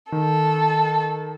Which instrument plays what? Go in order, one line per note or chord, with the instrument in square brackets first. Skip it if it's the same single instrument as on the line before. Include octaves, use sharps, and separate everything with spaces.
[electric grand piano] D#3 [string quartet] A4